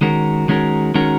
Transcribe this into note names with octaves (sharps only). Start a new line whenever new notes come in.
D#3 G#3 C#4 F#4 A#4
D#3 G#3 C#4 F#4 A#4
D#3 G#3 C#4 F#4 A#4